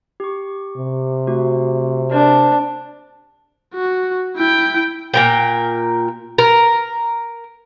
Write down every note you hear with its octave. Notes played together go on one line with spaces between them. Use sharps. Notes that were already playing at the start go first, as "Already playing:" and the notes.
G4 C#6
C3
A3 F#4
D4 A#4 C5 D5
F#4
E4 G5
A#2 A#4 G5
A#4